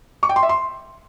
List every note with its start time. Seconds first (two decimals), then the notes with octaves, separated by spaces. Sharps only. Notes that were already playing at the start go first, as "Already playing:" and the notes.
0.23 C#6
0.29 G5
0.36 C6
0.43 E5
0.49 C6